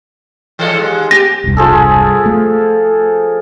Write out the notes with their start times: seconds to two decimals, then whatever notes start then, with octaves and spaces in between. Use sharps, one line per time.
0.59 E3 G#3 A4
0.79 D#2 G#3
1.11 G4 A#6
1.44 E1 C2 G2
1.57 F3 G#4 A4
2.26 A3